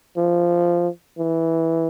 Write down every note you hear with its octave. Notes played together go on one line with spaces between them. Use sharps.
F3
E3